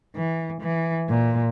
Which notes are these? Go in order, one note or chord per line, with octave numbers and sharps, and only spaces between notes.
E3
E3
A#2